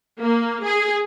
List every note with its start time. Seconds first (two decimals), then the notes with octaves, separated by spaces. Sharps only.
0.19 A#3
0.64 G#4